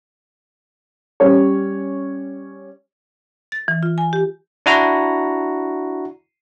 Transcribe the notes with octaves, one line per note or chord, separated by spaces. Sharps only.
G3 C#4 C#5
A6
E3
F4
G#5
G4
D4 E4 F#4 A#5